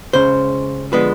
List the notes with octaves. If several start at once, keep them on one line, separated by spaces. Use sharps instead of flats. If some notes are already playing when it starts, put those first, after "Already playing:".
C#2 C#3 C5
D3 F3 G#3 B3 B4